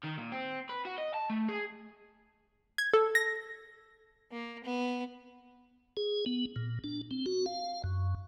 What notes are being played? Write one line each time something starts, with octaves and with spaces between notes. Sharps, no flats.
D#3
A#2
C4
B4
F#4
D#5
A5
A3
G#4
G#6
A4
A#6
A#3
B3
G#4
B3
A#2
D4
C4
F#4
F5
F#2